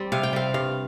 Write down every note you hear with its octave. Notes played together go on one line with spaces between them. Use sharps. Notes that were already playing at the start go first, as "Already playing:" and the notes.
Already playing: G3 C4
C3 F5
G5
G3 C4 F5
G2 F5